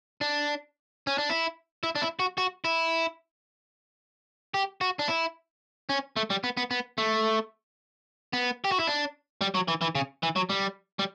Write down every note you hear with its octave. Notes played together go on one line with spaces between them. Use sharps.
D4
C#4
D4
E4
E4
D4
E4
F#4
F#4
E4
G4
F#4
D4
E4
C#4
A3
G3
B3
B3
B3
A3
B3
G4
F#4
E4
D4
G3
F#3
E3
E3
C#3
E3
F#3
G3
G3